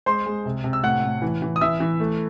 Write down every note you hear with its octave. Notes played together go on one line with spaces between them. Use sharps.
G#3 C5 C6
G#3
C3
C3
E6
A2 F#5 F#6
A2
E3
E3
D#6
E3 E5 E6
E3
A3